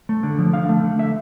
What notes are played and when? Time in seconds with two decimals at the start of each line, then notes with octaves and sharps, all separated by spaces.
0.09 A3
0.23 D3
0.38 F3
0.53 D3 F5
0.69 A3
0.84 D3
0.99 A3 E5